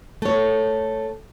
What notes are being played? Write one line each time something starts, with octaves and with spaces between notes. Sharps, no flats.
A3 C#5